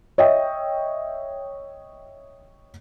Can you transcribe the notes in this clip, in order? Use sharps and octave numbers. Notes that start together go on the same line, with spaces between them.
C#5 D#5 E5 G5